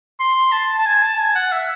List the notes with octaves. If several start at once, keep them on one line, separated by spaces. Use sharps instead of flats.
C6
A5
A5
G#5
A5
G#5
F#5
E5